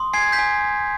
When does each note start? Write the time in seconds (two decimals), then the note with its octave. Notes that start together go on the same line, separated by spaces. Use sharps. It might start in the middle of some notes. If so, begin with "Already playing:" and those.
Already playing: C6 D#6
0.13 G#5 G#6 C7
0.32 G6 B6
0.39 G#5